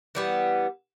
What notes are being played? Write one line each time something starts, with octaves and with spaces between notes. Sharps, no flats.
E3 G3 B3